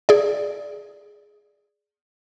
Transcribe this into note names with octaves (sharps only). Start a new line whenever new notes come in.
G#4 D5